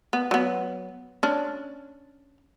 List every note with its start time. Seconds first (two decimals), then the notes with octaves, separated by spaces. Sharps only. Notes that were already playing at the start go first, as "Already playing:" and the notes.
0.13 B3
0.31 F#3 B3
1.23 C#4 D4